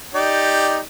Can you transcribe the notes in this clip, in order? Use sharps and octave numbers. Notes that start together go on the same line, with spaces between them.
D#4 G4 D5